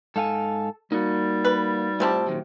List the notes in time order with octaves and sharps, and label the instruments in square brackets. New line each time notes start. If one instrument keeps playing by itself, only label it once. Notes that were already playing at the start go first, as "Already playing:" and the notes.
[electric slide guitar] G#2 F5 G#5 [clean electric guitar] A4
[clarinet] G3 [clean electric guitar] A#3 [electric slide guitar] D#4 F#4
[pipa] B4
[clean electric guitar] A2 F4 A5 [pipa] C3 C4 G4
[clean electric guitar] A#2 D#3 F#3